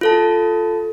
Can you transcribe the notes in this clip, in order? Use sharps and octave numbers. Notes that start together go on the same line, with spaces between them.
F4 A4 A5